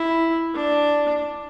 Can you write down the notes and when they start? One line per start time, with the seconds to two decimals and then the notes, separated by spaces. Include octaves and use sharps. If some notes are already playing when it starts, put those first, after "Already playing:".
Already playing: E4
0.55 D4